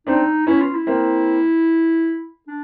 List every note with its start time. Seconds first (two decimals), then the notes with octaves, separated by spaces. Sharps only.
0.07 C4 D4 D#4
0.47 B3 C#4 E4
0.61 F4
0.75 E4
0.87 A#3 C4
2.47 D4